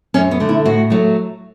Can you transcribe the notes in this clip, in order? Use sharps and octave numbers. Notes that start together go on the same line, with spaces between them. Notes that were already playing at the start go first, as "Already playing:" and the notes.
F#2 C#4
B3
D3 A3
E4
A2 F#4
F#3 A3